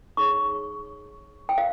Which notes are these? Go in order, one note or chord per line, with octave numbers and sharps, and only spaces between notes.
D#4 G#4 C#5 C#6
G5
F5